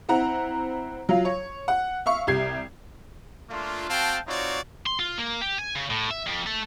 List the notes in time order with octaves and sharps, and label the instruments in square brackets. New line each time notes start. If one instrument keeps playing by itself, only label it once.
[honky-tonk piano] C4 E4 F#5 A#5
F#3 F4 F5
C#5
F#5
E5 F5 C#6
C2 G4 G#6 C7
[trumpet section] A3 A#3 D4 F4
C4 F#4 F5 G5 A5
C4 D#4 F4 F#4 C#5 D5
[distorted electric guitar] C6
F4
A#3
G4
G#5
C#3
A2
E5
F2
A3